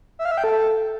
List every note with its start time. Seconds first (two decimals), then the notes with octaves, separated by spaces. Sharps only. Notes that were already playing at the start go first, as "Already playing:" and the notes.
0.19 E5
0.25 F5
0.31 E5
0.38 G5
0.44 A4